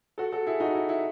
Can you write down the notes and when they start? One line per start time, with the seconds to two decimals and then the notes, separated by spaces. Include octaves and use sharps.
0.18 F#4 A4
0.32 F#4 A4
0.46 E4 G#4
0.60 D#4 F#4
0.74 E4
0.89 E4